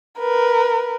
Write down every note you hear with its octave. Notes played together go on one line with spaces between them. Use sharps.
A#4 B4